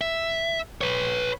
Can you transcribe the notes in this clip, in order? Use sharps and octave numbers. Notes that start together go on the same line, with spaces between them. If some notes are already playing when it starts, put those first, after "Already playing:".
E5
B4 C#5